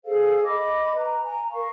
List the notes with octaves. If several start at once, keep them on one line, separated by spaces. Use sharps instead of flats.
G#4 A4 C5 F5
D#5 B5 D6
B4 A#5
G#5 A#5
A#4 F5 C#6